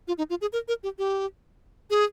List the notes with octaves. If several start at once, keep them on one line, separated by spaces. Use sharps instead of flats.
F4
D#4
F4
G#4
A#4
A#4
G4
G4
G#4